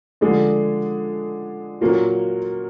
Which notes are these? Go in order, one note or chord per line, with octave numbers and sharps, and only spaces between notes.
D3 F3 G#3 D4 G#4
A#2 F#3 A#3 F4